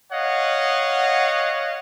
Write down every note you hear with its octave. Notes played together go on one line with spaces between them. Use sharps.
C#5 D#5 F5 F#5